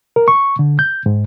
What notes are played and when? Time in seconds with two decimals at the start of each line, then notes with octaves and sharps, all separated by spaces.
0.16 A#4
0.28 C#6
0.59 D3
0.79 G6
1.06 G#2